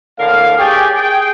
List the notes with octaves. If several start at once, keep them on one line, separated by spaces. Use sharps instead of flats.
A2 D3 A#4 F5
G4 G#4 C#5 D5 G5 G#5
G#4 G5